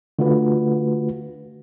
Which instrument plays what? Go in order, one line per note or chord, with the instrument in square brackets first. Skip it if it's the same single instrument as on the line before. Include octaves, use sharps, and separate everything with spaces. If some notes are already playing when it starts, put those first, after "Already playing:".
[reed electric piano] D3 A3 F4 F#4 B4